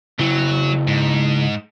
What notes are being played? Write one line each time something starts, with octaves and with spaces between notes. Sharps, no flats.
C#3 F#3 E4
G#2